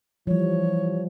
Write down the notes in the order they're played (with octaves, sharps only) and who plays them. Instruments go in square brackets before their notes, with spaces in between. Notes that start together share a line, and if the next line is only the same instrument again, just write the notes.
[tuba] E3 [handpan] F3 G3 [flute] C#5